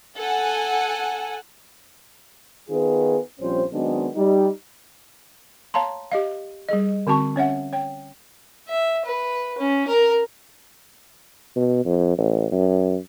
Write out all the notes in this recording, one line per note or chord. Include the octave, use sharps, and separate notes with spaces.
A4 F#5 G#5
D#3 B3 F4 G#4
A#1 F3 G3 C4 C#4 C5
D#3 F#3 G#3 B3 C4 D4
G3 D#4
C#5 F5 A5 A#5 C6
G4 D#5 F5
G3 G#4 D#5
D3 C4 F#4 A5 C#6
C#4 C#5 E5 F#5
C#5 G5
E5
B4
C#4
A#4
B2
F2
A1
F#2